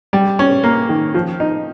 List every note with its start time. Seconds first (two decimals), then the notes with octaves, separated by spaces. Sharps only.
0.13 G3
0.39 C#4
0.64 A#3
0.89 D#3
1.14 F3
1.40 D#4